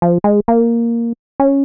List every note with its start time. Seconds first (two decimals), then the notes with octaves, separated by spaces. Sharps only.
0.02 F3
0.24 G#3
0.48 A#3
1.40 C#4